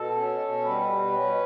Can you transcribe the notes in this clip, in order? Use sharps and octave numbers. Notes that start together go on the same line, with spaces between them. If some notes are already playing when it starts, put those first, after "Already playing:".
Already playing: B2 A4
C#4
B2
G3 B4
B2
C#4